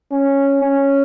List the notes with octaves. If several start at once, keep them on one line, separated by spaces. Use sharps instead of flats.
C#4
C#4